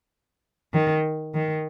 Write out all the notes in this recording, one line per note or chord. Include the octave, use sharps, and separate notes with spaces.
D#3
D#3